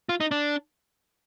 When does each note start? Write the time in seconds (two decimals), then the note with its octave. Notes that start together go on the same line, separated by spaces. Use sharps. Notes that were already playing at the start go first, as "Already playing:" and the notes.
0.09 F4
0.20 D#4
0.31 D4